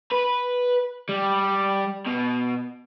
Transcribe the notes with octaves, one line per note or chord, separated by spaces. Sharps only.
B4
G3
B2